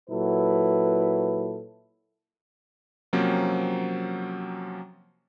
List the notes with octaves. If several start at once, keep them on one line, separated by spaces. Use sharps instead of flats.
A#2 F#3 E4 A4 B4
C3 F3 F#3 A#3 C4 C#4